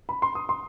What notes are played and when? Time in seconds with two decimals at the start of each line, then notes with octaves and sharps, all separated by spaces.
0.09 B5
0.22 C6
0.35 D#6
0.49 C6